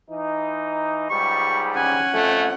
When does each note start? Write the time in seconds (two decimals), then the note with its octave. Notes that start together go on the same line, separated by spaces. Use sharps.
0.11 E3 D#4
1.10 C#2 G#2 G3 C#6
1.76 C#4 F#5 G#5
2.14 F2 A3 G#5